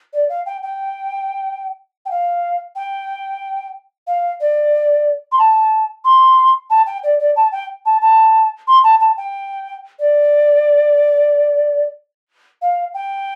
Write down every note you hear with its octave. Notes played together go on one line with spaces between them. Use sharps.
D5
F5
G5
G5
G5
F5
G5
F5
D5
C6
A5
C6
A5
G5
D5
D5
A5
G5
A5
A5
C6
A5
A5
G5
D5
F5
G5